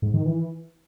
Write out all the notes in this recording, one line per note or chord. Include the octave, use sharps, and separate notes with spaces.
G#2
D#3
E3